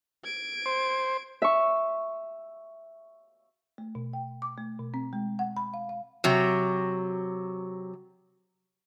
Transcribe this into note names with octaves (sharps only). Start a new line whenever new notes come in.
G#6 D7
C5
E5 C#6
A3
B2
G5
D6
A3
B2
C4
G#3
F#5
B5
F5
F5
C3 F#3